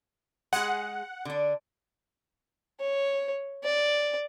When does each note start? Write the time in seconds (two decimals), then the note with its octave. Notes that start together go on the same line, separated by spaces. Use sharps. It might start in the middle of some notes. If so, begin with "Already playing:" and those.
0.53 G#3 G#4 F#5
1.25 D3 D4
2.80 C#5
3.64 D5